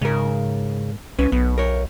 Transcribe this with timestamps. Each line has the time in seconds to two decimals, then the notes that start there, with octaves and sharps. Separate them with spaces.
0.01 G#2 C#3 A#4
1.19 C2 C#4 B4
1.32 B1 B3
1.58 A#4 C#5